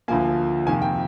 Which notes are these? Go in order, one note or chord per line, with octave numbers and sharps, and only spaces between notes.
D2 D3 F3 A#3 G#5
F2 C3 D#3 A#3 G#5
G5